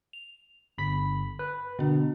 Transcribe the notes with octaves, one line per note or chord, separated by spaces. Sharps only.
F7
G1 B5 B6
B4
B2 D3 D4